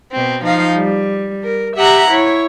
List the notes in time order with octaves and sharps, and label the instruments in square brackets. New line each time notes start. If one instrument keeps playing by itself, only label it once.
[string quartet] B2 C4
F3 D#4 F5
G3
A#4
G4 E5 F#5 A#5
E4 C#5